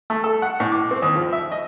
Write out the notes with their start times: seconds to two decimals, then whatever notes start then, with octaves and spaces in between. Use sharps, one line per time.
0.10 A3
0.24 A4
0.42 F#5
0.60 A2
0.72 D6
0.91 C4
1.02 D#2
1.16 F3
1.33 E5
1.52 D#5